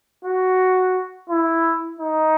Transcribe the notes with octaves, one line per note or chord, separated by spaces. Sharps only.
F#4
E4
D#4